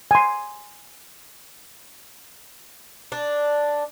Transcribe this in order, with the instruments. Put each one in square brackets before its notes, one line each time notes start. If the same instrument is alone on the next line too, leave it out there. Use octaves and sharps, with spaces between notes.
[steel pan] G#5 C6
[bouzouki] D4